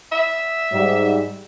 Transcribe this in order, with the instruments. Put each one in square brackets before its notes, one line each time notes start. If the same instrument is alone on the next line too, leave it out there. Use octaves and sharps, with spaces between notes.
[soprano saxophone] E5
[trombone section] G#2 G3